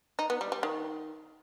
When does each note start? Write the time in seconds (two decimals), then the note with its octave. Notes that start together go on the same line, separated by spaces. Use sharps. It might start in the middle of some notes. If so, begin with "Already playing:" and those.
0.19 D#4
0.30 B3
0.41 G3
0.52 G3
0.63 D#3